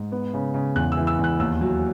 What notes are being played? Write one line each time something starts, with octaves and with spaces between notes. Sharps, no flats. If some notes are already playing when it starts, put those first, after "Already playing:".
Already playing: G#2
B3
C#3
C#3
E2 F#6
E6
E3
E6
E2
F#6
D#2 E6
F#3